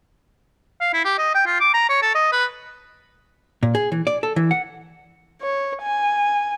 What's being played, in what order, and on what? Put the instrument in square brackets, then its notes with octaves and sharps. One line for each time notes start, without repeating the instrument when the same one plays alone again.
[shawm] F5
E4
G4
D#5
G5
F4
D6
A#5
C#5
A4
D#5
B4
[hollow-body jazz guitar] A#2
G#4
E3
D5
A4
E3
F#5
[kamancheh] C#5
G#5